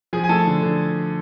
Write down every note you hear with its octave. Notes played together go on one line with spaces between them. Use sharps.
F3 G#4 G#5
G#5
A3 A4 A5
D3
D3